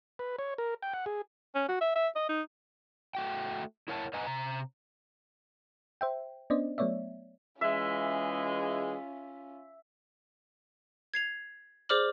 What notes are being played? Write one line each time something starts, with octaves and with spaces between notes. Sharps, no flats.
B4
C#5
A#4
G5
F#5
G#4
C#4
F#4
E5
E5
D#5
D#4
A3 F#4 G5
E4 A#4 C#5 F#5 G#5 A5
B4 D#5 F#5 G#5 A#5
C3 A#5
C5 E5 G5
B3 C#4 D4 C5 D5 D#5
F#3 A3 B3 C#5 D5 E5
E3 G#3 C#4 F4 E5
G#6 C7 F7
G#4 C5 D5 D6 F6 F#7